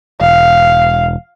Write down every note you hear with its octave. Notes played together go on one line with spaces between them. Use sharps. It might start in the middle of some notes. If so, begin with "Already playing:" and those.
E1 F5